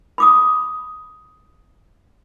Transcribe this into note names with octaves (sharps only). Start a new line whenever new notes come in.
B5 D6 D#6